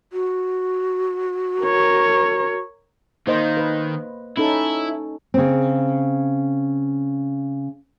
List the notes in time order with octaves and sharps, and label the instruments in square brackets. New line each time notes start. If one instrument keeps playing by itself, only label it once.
[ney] F#4
[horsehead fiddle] A#4 C#5
[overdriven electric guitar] D#3 [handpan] A#3 C5 D#5
[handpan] B4
[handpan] C#4 D#4 A4 [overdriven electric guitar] E4
[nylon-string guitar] C#3 C4